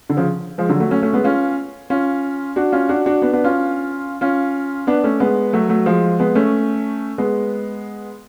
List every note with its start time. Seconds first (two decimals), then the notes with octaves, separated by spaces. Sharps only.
0.10 D3
0.17 C#3 F3
0.58 F3 G#3
0.69 D3 F#3
0.80 F#3 A3
0.91 A3 C#4
1.02 A3 C#4
1.13 G#3 B3
1.24 C#4 F4
1.90 C#4 F4
2.56 D4 F#4
2.72 C#4 F4
2.89 D4 F#4
3.06 D4 F#4
3.22 B3 D4
3.33 B3 D4
3.44 C#4 F4
4.21 C#4 F4
4.87 B3 D4
5.04 A3 C#4
5.20 G#3 B3
5.53 F#3 A3
5.69 F#3 A3
5.86 F3 G#3
6.19 G#3 B3
6.35 A3 C#4
7.18 G#3 B3